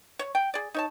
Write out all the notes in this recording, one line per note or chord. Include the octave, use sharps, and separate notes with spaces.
C#5
G5
G#4 D5
D#4 C#5 A5